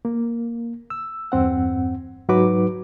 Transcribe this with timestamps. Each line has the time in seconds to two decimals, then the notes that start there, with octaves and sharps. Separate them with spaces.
0.05 A#3
0.90 E6
1.32 E2 G2 C4 F#5
2.29 G#2 F#3 D#4 F#4 B4 D6